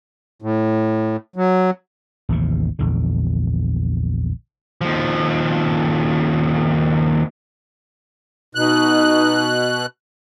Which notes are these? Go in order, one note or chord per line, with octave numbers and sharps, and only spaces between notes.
A2
F#3
A1 D#2 C3
A#1 E2 D3
D#2 F3
B2 D#4 F#6